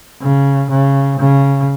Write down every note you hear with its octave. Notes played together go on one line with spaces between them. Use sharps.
C#3
C#3
C#3